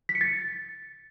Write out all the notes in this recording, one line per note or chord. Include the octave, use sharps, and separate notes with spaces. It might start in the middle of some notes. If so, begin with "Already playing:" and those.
B6
C#7
A6